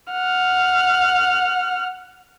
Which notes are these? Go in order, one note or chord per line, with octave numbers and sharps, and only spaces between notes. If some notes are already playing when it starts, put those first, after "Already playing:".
F#5 F6